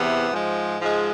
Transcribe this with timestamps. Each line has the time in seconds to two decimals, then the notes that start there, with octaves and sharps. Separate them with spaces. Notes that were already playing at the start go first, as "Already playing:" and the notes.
Already playing: E2 C3 E3 B3
0.30 G#2 F3 G#3
0.79 G#2 F3 G#3